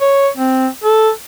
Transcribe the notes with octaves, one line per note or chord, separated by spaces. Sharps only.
C#5
C4
A4